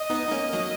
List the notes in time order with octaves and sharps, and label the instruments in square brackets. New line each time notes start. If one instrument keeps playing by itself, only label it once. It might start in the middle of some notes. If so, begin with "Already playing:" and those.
Already playing: [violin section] D#5
[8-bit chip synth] B3 D#4
D#4
A#3 C#4
F#3 A#3